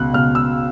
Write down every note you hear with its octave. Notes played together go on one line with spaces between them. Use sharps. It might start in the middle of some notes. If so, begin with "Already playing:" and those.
Already playing: C#2 B2 F#6
C#2 B2 F6
E6